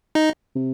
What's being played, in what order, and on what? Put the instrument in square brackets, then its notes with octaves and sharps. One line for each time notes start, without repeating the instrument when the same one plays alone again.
[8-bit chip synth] D#4 D#5
[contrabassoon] C3